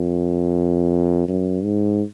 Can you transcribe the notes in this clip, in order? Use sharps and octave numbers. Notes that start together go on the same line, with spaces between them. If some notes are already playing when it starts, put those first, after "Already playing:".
Already playing: F2
F#2
G#2